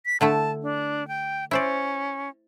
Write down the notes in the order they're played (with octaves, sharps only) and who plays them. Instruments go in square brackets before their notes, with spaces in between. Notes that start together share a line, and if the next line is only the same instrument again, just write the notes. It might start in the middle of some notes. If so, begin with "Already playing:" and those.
[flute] B6
[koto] D3 A3 E4 [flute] A5
[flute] D4
G5
[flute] C#4 [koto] E4 C5 D5